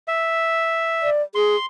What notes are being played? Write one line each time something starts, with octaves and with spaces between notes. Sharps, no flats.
E5
D5
G#4 C6